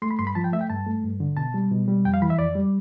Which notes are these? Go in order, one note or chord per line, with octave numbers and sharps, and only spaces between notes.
A3 C6
B5
G2 C6
B5
F3 A5
G5
A3 E5
G5
G2 A5
A3
G2
D3
B2 A5
G3
B2
G3
F2 G5
F5
E3 B5
E5
F2 D5
G3